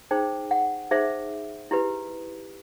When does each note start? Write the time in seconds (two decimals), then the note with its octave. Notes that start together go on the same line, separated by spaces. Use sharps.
0.11 D#4 G#4 C5 G5
0.51 F#5
0.91 D#4 G#4 C5 E5
1.71 E4 G4 B4